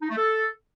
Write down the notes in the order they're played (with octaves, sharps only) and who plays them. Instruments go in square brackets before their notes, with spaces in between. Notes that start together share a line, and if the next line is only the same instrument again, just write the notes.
[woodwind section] D#4
A3
A4